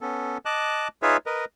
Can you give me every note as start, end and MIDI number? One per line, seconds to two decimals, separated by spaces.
0.01 0.38 59
0.01 0.38 61
0.01 0.38 69
0.45 0.88 75
0.45 0.88 81
0.45 0.88 86
0.45 0.88 90
1.02 1.17 63
1.02 1.17 65
1.02 1.17 68
1.02 1.17 71
1.02 1.17 73
1.02 1.17 76
1.26 1.45 70
1.26 1.45 71
1.26 1.45 75